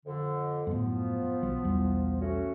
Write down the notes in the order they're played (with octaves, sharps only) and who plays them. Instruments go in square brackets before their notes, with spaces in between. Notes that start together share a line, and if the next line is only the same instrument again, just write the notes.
[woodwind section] F2 D3
[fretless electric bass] F#2 A2 [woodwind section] F3 B3
[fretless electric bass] B1 F#3
B1 E2 G3
[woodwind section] A3 C#4 F#4